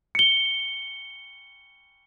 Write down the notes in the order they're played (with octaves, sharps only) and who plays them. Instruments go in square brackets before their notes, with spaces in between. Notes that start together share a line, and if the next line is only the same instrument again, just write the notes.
[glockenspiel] C#7 G7